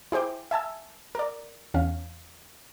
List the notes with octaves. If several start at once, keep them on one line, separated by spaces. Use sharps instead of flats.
E4 G#4 C5 G5 D6
E5 G#5 A5 E6
A#4 D5
E2 C#4 F5